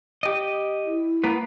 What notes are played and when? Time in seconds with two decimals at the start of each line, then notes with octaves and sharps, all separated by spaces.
0.23 G4 D#5
0.84 E4
1.24 A#3 B3 B4